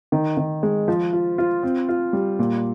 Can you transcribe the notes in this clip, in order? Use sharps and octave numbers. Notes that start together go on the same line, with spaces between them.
D#3
D#3
G#3
F3
F4
F4
C4
F4
G3
A#2